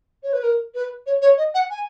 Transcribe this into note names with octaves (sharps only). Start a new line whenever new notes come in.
C#5
B4
A#4
B4
C#5
C#5
D#5
F#5
G#5